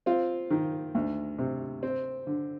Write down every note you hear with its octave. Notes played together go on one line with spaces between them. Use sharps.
C4 F4
D#3
D2
C3
C4
D3